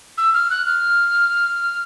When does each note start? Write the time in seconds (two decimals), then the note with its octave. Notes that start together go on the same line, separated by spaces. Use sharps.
0.18 E6
0.34 F6
0.50 F#6
0.66 F6